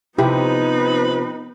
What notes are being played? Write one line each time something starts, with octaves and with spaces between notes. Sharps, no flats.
C3 F3 B3 C4 D#4 E4 G4 B4